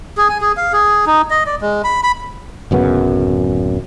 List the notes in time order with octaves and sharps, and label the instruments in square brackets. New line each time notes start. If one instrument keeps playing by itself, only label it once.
[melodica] G#4
G#5
G#4
F5
G#4
D#4
D#5
D5
G#3
B5
B5
[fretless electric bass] D1 F#2 C#3 B3